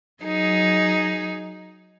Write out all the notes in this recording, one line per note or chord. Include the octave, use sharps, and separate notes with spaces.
F#3 D#4 G#4